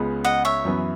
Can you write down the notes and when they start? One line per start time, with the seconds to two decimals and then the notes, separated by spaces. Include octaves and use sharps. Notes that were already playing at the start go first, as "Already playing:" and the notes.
Already playing: C#2 C#3 G#3 B3
0.24 D#5 F#5
0.45 C#5 E5
0.65 F#2 E3 B3 E4